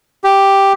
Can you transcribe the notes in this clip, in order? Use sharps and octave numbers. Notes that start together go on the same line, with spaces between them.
G4